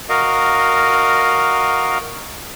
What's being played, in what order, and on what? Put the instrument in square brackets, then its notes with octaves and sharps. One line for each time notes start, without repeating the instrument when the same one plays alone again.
[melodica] F#4 A#4 D#5 F5